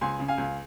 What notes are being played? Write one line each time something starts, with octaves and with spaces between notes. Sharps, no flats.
C#2 G#5 C6
C#3
F5 G#5
C#2